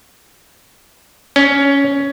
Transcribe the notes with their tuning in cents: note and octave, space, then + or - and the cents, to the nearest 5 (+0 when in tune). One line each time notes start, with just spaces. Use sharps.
C#4 +10